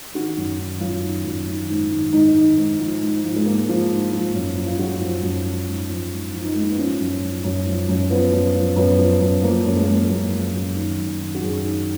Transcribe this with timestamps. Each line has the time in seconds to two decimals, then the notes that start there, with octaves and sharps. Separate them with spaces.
0.14 D#3 F#4
0.37 F#2
0.59 D#3
0.80 F#2 F4
1.03 D#3
1.25 F#2
1.47 D#3
1.70 G#2
1.91 D#3
2.13 G#2 D#4
2.36 D#3
2.57 G#2
2.79 F3
3.02 G#2
3.24 F3
3.36 G#3
3.45 G#2 A#3
3.68 F3
3.91 G#2
4.12 F3
4.34 F#2
4.57 F3
4.66 F4
4.79 F#2 F#4
5.01 F3
5.22 F#2
5.45 F3
5.67 G#2
5.89 F3
6.11 G#2
6.33 F3
6.44 D#4
6.54 G#2 G#3
6.61 A#3
6.69 B3
6.77 F3 C#4
7.00 F#2
7.22 F3
7.44 F#2
7.66 F3
7.89 F#2
8.10 F3 B3
8.32 F#2
8.54 F3
8.76 F#2 B3
8.98 F3
9.21 F#2
9.42 F3 A#3
9.65 F#2
9.76 G#3
9.83 A#3
9.88 F3 G#3
10.08 F#2 A#3
10.31 F3
10.53 F#2
10.75 D#3
10.97 F#2
11.20 D#3
11.34 F#4
11.41 F#2 G#4
11.64 D#3